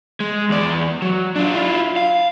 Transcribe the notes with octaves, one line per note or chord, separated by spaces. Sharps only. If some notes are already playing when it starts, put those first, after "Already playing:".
G#3
E2 D5
F#3
D4 F4
E4 F4
F5